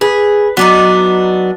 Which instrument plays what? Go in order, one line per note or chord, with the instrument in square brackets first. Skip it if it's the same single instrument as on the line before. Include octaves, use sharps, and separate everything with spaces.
[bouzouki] G#4 [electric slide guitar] B4
[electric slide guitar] F#3 [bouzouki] B3 D4 D#4